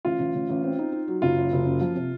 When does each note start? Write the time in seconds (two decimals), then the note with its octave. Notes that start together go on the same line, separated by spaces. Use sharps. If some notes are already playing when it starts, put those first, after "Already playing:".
0.05 A1 F4
0.19 A1
0.34 A1
0.49 A1
0.63 C4
0.79 D#4
0.92 D#4
1.08 F#3
1.22 F#1 F4
1.37 F#2
1.52 F#1
1.66 F#2
1.81 F3
1.95 C3